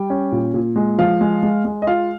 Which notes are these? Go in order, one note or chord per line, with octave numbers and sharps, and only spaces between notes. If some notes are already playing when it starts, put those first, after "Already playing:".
Already playing: G3 G5
C#4
A#2
A#2
G#3
F3 F5
G#3
G#3
G#3
D#5
F4 F5